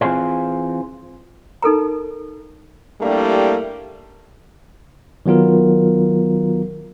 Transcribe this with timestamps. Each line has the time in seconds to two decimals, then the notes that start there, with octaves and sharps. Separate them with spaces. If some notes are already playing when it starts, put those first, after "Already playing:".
0.01 E3 C4 F4 G#4 C5
1.62 D#4 A4 A#4 A#5
3.00 G3 A3 A#3 D4 E4 G4
5.26 D#3 F#3 B3 F4 A#4